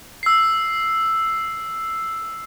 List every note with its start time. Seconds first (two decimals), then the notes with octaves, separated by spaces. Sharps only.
0.23 E6 C7